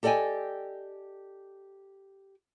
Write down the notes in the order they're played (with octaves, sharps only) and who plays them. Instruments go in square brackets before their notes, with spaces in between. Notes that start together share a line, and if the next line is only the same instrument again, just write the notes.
[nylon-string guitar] G4 A4 D5 D#5 G5 G#5